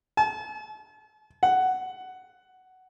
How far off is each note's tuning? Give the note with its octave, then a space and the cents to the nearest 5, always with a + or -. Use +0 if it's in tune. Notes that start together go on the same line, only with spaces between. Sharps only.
A5 -40
F#5 +10